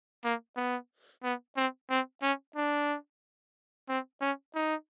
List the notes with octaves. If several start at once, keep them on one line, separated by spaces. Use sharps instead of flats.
A#3
B3
B3
C4
C4
C#4
D4
C4
C#4
D#4